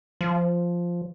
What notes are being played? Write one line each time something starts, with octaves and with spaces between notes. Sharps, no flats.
F3